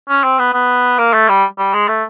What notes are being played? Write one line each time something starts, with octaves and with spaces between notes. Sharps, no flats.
C#4
C4
B3
B3
A#3
A3
G3
G3
G#3
A3